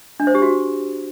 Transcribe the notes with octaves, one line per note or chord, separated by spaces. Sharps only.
D4
C5
G4
F#4